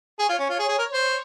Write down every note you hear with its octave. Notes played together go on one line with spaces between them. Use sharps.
G#4 C#5
F4
C#4
F4
G#4
G#4
A#4
C5